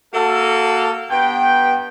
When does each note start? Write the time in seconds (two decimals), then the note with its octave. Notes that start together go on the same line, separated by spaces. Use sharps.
0.13 A#3 F#4 A4
1.11 G2 B3 G5